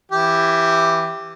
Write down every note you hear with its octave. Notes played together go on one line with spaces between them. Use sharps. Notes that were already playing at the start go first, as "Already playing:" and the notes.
E3 E4 G4